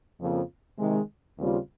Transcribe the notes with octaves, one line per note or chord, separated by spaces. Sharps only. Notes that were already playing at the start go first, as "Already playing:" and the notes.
F2 C#3 F3 A#3 F4
C3 D#3 G#3
D#2 C#3 G3 C4 F4